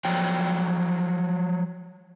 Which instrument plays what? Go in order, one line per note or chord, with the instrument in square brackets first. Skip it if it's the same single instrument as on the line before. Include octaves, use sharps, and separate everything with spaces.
[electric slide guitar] F3 F#3 G5